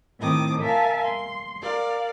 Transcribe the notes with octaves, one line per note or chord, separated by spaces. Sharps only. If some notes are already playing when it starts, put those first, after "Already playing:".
A2 D#3 C4 D6 D#6
A#4 E5 F5 G#5 A5
C6
A#4 D5 F5